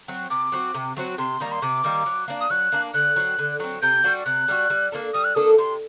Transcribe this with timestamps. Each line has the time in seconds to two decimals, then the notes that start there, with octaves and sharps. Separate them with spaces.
0.08 F#3 C4
0.30 C3 D6
0.52 F#3 C4 F#4
0.74 C3
0.97 F#3 C4 F#4
1.18 C3 C6
1.40 D#3 G3 A#3 A#5
1.52 C6
1.62 C3 D6
1.84 D#3 G3 A#3
2.06 F#3
2.28 A#3 D4
2.41 D#6
2.50 F#3 F#6
2.72 A#3 D4
2.94 D3 F#6
3.16 F#3 C4
3.39 D3
3.60 F#3 C4
3.82 C3 G6
4.04 G3 D4 F#4
4.25 C3 F#6
4.48 G3 D4 F#4
4.70 G3
4.92 A#3 D4 A4
5.14 G3 D#6
5.24 F#6
5.35 A#3 D4 A4 D#6
5.58 C3 C6